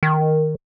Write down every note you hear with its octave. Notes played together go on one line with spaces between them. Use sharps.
D#3